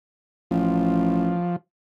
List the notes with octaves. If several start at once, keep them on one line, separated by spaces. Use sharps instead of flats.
A1 F3